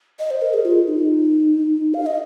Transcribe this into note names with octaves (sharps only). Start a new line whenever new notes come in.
D#5
C5
A#4
G#4
F4
D#4
F5
D#5